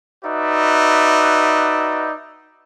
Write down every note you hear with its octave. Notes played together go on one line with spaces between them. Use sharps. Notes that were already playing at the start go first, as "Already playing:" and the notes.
D#4 F#4 B4 D5 E5